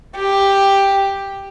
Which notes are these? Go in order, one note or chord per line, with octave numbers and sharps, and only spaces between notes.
G4